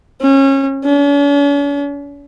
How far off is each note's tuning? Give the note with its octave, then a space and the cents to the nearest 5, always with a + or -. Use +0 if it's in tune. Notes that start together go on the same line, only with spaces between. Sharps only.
C#4 -25
C#4 +45